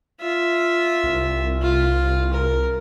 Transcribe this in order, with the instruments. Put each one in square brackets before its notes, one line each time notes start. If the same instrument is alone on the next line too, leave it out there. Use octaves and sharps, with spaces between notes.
[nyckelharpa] F4 E5
[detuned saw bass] C2
[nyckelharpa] F4
A#4